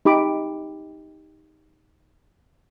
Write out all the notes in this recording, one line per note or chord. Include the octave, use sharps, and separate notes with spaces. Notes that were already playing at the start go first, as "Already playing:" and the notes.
D#4 G4 B5 D6